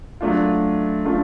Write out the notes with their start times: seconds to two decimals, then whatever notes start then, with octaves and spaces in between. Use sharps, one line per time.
0.21 F#3 A3 D4 F4
1.05 F#3 A3 D4 F4